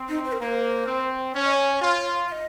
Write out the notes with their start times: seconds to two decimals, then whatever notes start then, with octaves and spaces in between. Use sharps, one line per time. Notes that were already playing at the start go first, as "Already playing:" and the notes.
Already playing: C4
0.09 D#4
0.25 C5
0.32 A#4
0.40 A#3 C5
0.87 C4
1.34 C#4 C#5
1.45 D#5
1.53 C#5
1.81 F4 C#5
2.28 F5
2.32 D#5